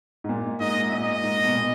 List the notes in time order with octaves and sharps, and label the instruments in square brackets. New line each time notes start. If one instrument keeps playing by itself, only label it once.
[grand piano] G#2
A#2
[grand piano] G#2 [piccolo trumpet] D#5
[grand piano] A#2 [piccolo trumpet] D#5
[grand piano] G#2
B2
A#2